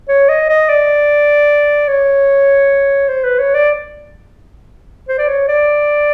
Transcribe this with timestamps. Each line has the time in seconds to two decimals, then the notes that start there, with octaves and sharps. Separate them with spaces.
0.09 C#5
0.29 D#5
0.49 D#5
0.69 D5
1.88 C#5
3.08 C5
3.24 B4
3.39 C#5
3.54 D5
5.09 C5
5.18 D5
5.28 C#5
5.48 D5